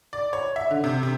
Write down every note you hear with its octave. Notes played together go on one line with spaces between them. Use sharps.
D5
C#5
E5
D3
C3
C3